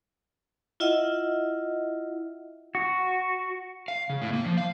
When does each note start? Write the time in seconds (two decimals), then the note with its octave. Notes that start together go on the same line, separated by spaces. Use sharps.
0.80 E4 F4 D#5 E5 F#5
2.75 F#4
3.88 F5
4.10 C#3
4.22 A2
4.33 A#3
4.45 F3
4.57 F5